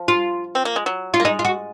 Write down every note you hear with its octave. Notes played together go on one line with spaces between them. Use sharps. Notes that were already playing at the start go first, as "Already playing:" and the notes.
Already playing: F3
F4
C4
A#3
G#3
F#3
F4
A#3
G#3 D#4
F4
F#4